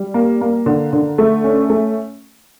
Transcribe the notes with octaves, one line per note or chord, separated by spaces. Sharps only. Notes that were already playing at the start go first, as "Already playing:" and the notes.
Already playing: G3
A#3
A#3
D3
D3
A3
C#4
A3